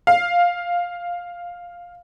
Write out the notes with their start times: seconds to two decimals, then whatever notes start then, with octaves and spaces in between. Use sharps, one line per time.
0.07 F5